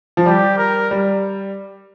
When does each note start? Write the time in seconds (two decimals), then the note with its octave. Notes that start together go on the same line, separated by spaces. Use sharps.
0.17 F3
0.26 G3 G4
0.58 A#4
0.91 G3